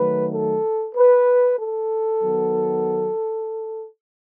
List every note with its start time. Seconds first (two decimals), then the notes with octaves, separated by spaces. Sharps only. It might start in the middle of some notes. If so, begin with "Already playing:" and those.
Already playing: D#3 F#3 A3 B4
0.32 A4
0.95 B4
1.58 A4
2.21 D#3 F#3 B3